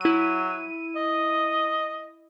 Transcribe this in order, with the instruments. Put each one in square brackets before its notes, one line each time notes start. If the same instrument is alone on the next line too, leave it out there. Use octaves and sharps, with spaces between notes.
[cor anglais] F#3 [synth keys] E4 D#7
[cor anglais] D#5